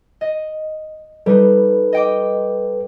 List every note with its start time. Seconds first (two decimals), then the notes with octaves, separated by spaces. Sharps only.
0.21 D#5
1.26 G3 D#4 A4 B4
1.93 D#5 G5 D6